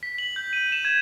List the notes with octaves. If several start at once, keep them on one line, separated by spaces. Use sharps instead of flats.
B6
F#7
G6
D#7
E7
G#6